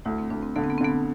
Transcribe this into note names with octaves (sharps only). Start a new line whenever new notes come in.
D2 E4
C4
D2 D4
C4
D3 B3
C4
B3
C4
D3 B3